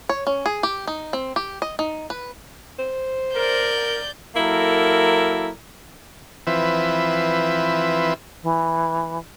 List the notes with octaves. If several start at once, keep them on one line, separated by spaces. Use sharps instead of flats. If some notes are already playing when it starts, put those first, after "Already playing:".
C#5
C#4
G#4
G4
D#4
C4
G4
D#5
D#4
B4
C5
A#4 D5 G6
F#3 A#3 E4 A4 A#4
E3 F3 C4 B4 E5
E3